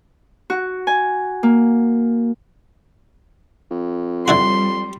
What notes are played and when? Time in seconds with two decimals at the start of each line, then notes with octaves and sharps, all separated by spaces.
0.50 F#4
0.87 G#5
1.43 A#3
3.71 F2
4.28 D3 G3 E4 F#4 C6